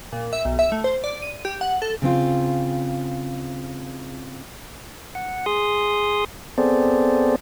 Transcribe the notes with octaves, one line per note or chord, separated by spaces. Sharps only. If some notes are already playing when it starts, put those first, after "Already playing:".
A#2
E5
B1
E5
A3
C5
D5
D#7
G4
F#5
A4
C#3 C4 F4
F#5
G#4 C6 D#6
B3 C4 G#4 A4 C5 D5